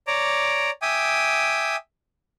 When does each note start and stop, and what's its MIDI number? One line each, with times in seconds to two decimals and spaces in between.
0.07 0.70 73
0.07 0.70 74
0.07 0.70 82
0.07 0.70 86
0.82 1.76 76
0.82 1.76 79
0.82 1.76 80
0.82 1.76 86
0.82 1.76 87